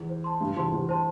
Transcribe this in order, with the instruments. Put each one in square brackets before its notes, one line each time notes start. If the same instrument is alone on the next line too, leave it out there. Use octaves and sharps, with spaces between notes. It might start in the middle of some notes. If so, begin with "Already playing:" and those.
Already playing: [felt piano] E2
[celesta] C5
A5 C6
[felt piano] G2 [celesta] G4
[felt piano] E2 [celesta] C5 A5 C6
[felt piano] E2 [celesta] G4
[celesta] C5 A5 C6